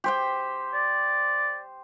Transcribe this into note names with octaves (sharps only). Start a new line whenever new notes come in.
G4 C5 G5
D5